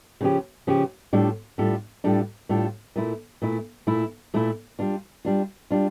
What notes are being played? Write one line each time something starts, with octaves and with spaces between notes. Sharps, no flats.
C#3 F3 C#4 G4
C#3 F3 C#4 G4
A2 G3 D4 F4 A4
A2 G3 D4 F4 A4
A2 G3 D4 F4 A4
A2 G3 D4 F4 A4
A#2 A3 E4
A#2 A3 E4
A#2 A3 E4
A#2 A3 E4
G3 D4 F4
G3 D4 F4
G3 D4 F4